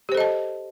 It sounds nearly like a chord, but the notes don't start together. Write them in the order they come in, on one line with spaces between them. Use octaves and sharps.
G4 C5 A4 D#5 A5